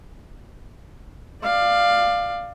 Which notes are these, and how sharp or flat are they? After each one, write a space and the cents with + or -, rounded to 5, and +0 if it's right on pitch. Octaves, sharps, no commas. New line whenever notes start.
D5 +20 F5 +0